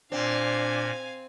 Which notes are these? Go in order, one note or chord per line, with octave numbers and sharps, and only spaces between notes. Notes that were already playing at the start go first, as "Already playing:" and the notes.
A#2 C4 D4 F5 G#5